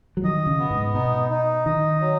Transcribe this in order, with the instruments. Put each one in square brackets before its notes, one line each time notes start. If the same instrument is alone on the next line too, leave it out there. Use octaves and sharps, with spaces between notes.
[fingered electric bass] F#3
[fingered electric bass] D#3 [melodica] D#5
[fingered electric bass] C#3
[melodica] B3
[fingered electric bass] G#2
[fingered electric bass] B2 [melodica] D#4
[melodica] D#4
[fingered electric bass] D#3 [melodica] D#5
[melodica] F#3